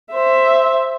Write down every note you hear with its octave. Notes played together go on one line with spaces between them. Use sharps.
C5 E5